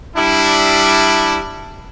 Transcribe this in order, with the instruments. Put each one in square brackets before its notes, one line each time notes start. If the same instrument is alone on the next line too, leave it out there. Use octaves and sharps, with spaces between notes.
[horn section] G3 D4 E4